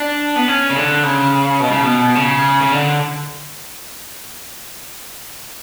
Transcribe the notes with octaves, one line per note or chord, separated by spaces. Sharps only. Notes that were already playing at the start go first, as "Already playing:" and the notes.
Already playing: D4
B3
C#4
C#3
D3
C#3
B2
C#3
B2
C#3
C#3
D3